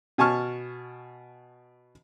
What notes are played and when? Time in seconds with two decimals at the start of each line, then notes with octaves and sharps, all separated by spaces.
0.18 B2 G#5 A5 C#6 F6